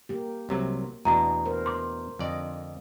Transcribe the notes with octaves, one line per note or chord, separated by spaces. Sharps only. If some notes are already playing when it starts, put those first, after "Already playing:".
A#3 G4
C2 C3 F#3
E2 B2 A3 D4 A#5
A#4 C5
C6 D6
F2 D3 D5 D#5